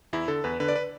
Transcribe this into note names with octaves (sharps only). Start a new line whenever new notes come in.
E2 E4
D3 A4
E2 B4
D3 B4
D5
B4